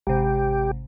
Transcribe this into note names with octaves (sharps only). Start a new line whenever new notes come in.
G#1 C3 G4